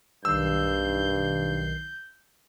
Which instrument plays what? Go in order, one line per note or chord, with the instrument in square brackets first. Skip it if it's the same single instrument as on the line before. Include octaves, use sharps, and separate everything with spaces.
[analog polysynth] B1 D#3 C7 [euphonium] G2 [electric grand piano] E6 [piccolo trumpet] G6